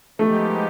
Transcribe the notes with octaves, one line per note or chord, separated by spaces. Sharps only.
F3 G#3 A3 B3 D#4 G4